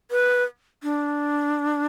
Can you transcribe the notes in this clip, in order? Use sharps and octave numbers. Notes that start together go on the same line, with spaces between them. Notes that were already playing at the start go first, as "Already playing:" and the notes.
B4
D4